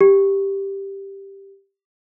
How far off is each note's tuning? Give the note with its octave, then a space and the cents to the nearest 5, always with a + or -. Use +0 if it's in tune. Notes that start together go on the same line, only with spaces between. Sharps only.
G4 +5